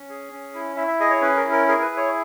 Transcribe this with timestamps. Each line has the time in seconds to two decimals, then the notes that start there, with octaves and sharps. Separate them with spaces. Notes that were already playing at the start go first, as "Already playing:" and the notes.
Already playing: C#4
0.09 G#4
0.32 C#4
0.54 E4
0.77 E4 E5
0.88 E5
1.00 G#4 D#5
1.10 C#5
1.22 C#4 B4
1.37 A#4
1.45 E4
1.52 A#4
1.68 G#4 A#4
1.82 B4
1.90 E4
1.97 C#5